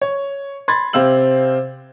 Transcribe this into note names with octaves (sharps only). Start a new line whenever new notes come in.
C#5
B5 C6 G#6 A6
C3 C4 F5 E6 F#7